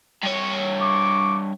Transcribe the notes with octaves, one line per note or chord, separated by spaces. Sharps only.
G2 C#5
C#6 D6